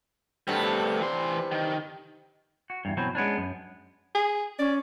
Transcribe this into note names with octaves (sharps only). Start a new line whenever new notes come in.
G2 C3 G3 A3 B3
E3 C6
D#3
F#4
E2 G2
B2 E3 F#3 C4
G#3 B3 C#4 D4
F#2
G#4
C#4 D5